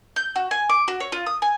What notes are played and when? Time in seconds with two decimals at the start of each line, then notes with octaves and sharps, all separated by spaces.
0.16 G6
0.36 F#4
0.51 G#5
0.70 D6
0.88 F#4
1.00 C#5
1.12 F4
1.26 D#6
1.42 G#5